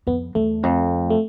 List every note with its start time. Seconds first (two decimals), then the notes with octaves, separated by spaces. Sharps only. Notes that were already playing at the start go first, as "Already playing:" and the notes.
0.07 F2 B3
0.35 E2 A3
0.63 F2
1.10 A3